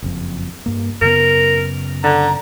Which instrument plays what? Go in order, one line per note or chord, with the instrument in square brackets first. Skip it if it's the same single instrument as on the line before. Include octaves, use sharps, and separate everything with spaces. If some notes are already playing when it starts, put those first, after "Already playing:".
[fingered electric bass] F#1 F2
G2 A#3
[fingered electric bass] F#2 C#3 B3 [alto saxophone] A#4
[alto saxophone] D3 [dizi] A#5